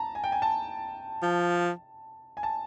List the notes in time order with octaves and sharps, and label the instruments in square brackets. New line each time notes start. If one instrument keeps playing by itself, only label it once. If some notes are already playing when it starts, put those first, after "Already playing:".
Already playing: [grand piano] A5 A#5
G#5
G5
G#5
A5
[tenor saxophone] F3
[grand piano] G#5
A5